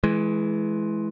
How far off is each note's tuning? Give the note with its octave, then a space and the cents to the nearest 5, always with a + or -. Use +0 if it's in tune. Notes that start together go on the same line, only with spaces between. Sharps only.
E3 +0 G#3 +25